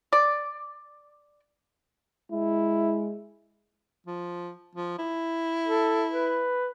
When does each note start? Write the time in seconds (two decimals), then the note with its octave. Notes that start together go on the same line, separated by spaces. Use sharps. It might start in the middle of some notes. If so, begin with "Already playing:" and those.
0.13 D5
2.32 G#3 E4
4.06 F3
4.75 F3
4.98 E4
5.68 A4
6.12 B4